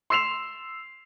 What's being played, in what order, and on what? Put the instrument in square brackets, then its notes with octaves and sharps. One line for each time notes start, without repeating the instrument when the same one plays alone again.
[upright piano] C6 E6 C7 E7 F7